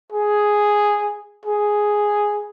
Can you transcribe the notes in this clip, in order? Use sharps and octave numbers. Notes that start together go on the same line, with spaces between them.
G#4
G#4